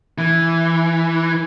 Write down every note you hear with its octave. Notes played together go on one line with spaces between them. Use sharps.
E3